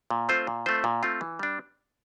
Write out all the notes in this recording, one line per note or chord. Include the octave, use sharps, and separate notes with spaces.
A#2
A3 C4 F4 C5
A#2
A3 C4 F4 C5
A#2
A3 C4 F4 C5
E3
G3 D4